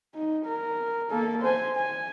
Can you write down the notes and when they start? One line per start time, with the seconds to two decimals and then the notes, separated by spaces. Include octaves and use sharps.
0.14 D#4
0.45 A#4
1.10 A#3 A4
1.42 C5 G#5
1.76 G#5